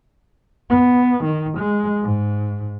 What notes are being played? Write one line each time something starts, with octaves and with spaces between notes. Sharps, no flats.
B3
D#3
G#3
G#2